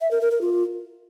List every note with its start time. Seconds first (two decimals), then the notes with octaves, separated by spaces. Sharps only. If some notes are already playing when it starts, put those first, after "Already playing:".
0.01 E5
0.11 A#4
0.21 A#4
0.31 A#4
0.41 F4